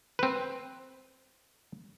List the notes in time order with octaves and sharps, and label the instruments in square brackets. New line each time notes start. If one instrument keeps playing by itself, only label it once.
[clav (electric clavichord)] C4 B4